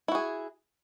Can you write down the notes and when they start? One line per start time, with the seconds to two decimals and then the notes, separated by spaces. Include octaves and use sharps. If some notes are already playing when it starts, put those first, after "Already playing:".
0.08 E4
0.12 F#4
0.15 G#4